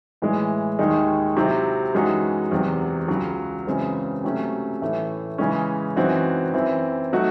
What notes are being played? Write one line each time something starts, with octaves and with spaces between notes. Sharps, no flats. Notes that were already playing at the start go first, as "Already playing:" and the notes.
A2 E3 G#3
D#2 D#3 G#3 D#4
C3 F#3 C4 E4
F#2 E3 G#3 D#4 F#4
E2 C3 F#3
C#2 C#3 F#3
F#2 C#3 E3 G#3 C4
C3 F#3 A3 C#4
A2 E3 A3
C#3 E3 G#3 C#4
F#2 E3 C4 D#4 F#4
F#2 E3 C4 E4
F#3 A3 D#4 F#4